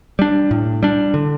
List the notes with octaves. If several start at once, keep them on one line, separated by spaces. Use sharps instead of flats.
G3 D4
A2
G3 D4
D3